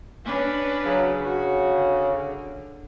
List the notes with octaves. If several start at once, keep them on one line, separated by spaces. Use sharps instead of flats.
C#4 D4 B4
C#3 F#3
F#4
D3